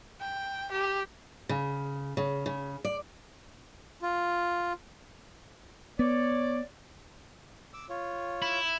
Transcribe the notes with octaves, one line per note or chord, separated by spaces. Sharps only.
G5
G4
C#3
C#3
C#3
D5
F4
B3 C#5 D5
D6 E6
F4 C#5
E4